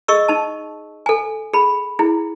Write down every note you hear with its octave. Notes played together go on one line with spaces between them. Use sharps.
G#4 D#5 C#6 E6
D#4 A5
A4 G#5
G#4 B5
E4 G#4